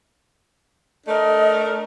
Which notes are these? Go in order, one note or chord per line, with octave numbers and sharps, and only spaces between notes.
A3 D4 A#4 D#5